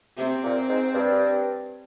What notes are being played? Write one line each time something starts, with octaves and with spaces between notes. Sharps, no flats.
C3 C4
A#2
G#2
G2